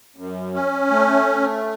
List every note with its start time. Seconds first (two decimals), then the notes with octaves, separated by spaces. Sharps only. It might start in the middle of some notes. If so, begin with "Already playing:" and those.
0.16 F#2
0.54 C#4
0.91 A3